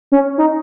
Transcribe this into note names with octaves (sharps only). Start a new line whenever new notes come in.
C#4
D#4